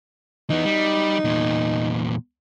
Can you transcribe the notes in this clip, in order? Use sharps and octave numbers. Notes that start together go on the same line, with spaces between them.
E3 B3 D#4
G3
E2 A#2